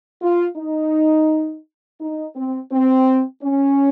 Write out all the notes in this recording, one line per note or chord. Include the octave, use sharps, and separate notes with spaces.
F4
D#4
D#4
C4
C4
C#4